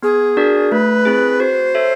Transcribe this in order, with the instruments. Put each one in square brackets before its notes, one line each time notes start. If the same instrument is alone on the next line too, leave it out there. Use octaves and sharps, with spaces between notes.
[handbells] B3 [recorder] G#4
[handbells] D4 F#4 A#4 D5
[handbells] A3 [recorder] B4
[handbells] C4 E4 G#4
[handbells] F#4 [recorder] C5
[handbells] A4 C#5 E5